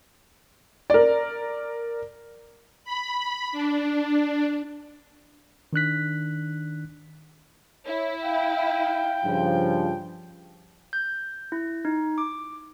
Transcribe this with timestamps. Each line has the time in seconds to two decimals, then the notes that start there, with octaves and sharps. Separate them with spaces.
0.90 A#4 D5
2.85 B5
3.52 D4
5.73 D#3 D4 F#6 B6
7.86 E4 C#5
8.23 F5 G5
9.25 G2 C#3 F3
10.93 G6
11.52 E4
11.85 D#4
12.18 D6